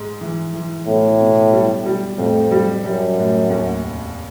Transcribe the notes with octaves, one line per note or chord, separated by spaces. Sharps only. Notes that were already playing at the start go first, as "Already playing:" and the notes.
Already playing: G#2 G#3
E3
E3
B1 A2
B2
G3
G3
F2 A2
G3
F#2 G3
A2
D#2
F1